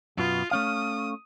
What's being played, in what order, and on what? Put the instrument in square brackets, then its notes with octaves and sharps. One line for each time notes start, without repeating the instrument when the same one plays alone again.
[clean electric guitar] F#2 B2 B3 [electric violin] F4
[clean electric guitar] A3 C#4 F5 [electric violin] D#6